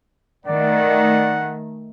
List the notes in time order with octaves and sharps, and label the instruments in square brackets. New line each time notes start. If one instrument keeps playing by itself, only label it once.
[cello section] D#3 A3 [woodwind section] D5 [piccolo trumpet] F#5